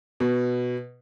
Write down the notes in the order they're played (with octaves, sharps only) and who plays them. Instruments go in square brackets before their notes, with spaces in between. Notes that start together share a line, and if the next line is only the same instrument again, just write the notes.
[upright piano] B2